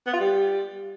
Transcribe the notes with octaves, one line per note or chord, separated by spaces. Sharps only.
B3
F4
G3